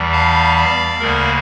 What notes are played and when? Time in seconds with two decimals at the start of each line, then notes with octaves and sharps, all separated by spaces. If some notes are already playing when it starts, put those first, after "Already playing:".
Already playing: E2 E3 G3
0.12 F5 A5
0.56 D5 F5
1.00 D2 C#3 G3 A#3 A#4 D5